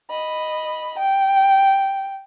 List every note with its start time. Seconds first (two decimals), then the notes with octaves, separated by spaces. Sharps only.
0.10 D#5 B5
0.98 G5